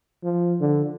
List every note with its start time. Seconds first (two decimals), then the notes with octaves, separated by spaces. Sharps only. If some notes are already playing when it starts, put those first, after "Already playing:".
0.24 F3
0.60 D3